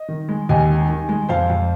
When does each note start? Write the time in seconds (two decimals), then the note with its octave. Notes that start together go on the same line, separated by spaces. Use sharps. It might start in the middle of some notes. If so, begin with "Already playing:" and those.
Already playing: D#5
0.09 D#3
0.29 G#3
0.49 D#2 D#5 G#5
0.70 D#4
0.89 D#3
1.09 G#3
1.29 F2 C5 F5
1.50 F2